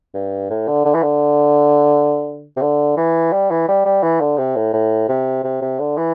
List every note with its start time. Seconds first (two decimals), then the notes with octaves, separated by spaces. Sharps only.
0.14 G2
0.50 A2
0.68 D3
0.85 D3
0.94 E3
1.03 D3
2.57 C3
2.62 D3
2.97 E3
3.32 G3
3.51 E3
3.68 G3
3.85 G3
4.03 E3
4.21 D3
4.38 C3
4.56 A2
4.73 A2
5.09 C3
5.44 C3
5.62 C3
5.80 D3
5.98 E3